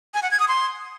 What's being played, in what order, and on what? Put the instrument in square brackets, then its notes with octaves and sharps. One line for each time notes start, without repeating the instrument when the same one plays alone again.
[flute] G#5
F#5
G#6
D#6
C6